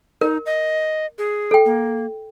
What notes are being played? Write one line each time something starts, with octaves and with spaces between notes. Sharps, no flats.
D#4 A#4
D#5
G#4
A4 G5
A#3